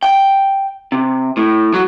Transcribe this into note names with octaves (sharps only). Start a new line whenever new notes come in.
G5
C3
A2
F#3